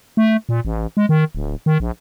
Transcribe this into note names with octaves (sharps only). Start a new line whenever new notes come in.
A3
A#2
A1
G#3
D#3
D1
D#3
A#1